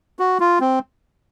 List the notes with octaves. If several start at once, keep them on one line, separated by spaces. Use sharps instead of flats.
F#4
F4
C4